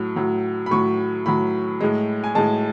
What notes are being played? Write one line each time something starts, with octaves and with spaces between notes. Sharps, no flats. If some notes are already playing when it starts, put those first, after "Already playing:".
Already playing: A2 F#3
A2 F#3
B5
A2 F#3 C#6
A2 F#3 B5
A2 G#3
G#5
A2 G#3 A5